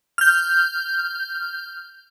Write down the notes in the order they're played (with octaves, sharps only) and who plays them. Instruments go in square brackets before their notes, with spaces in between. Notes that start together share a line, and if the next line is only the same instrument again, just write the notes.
[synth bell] F6 G6